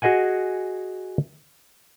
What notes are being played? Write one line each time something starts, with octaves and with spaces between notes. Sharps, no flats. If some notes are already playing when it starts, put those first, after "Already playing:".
F#4 G#4 D#5 F#5 G#5